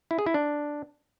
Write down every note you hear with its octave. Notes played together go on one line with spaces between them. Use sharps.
E4
G#4
E4
D4